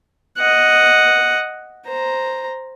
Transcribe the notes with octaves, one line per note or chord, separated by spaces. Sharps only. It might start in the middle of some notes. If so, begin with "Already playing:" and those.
D#5 F#5
C5 A#5